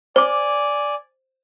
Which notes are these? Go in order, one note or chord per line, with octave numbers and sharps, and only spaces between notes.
C5 D5 G#5 D6